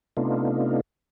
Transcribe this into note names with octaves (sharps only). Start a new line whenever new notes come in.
C3 A3 B3 D4 D#4 F4